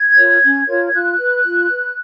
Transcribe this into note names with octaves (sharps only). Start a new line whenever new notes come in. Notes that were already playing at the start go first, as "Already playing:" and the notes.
Already playing: G#6
F4 A#4 C#5
C#4
F4 A#4 C#5
F4 F#6
B4
F4
B4